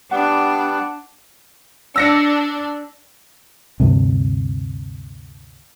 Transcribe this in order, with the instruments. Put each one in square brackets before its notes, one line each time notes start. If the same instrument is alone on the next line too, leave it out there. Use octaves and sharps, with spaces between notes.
[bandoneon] G3 B3 [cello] D4 [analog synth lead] F#5
[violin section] D4 [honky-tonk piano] E6 A#6 C#7
[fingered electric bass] D2 G2 C3